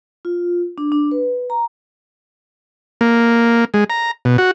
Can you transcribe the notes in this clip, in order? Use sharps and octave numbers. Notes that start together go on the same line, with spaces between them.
F4
D4
D4
B4
A#5
A#3
G#3
A#5
B2
F#4